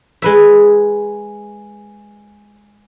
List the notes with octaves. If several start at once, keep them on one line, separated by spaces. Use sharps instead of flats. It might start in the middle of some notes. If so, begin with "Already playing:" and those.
G#3 B4 E5